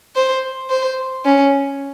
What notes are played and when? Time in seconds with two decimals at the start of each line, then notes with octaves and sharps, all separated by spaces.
0.16 C5
0.70 C5
1.25 C#4